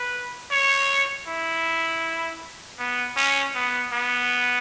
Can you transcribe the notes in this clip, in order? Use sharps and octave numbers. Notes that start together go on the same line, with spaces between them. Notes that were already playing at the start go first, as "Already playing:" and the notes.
Already playing: B4
C#5
E4
B3
C#4
B3
B3